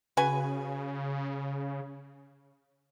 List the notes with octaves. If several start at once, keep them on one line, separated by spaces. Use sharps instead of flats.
C#3 F#4 B4 G#5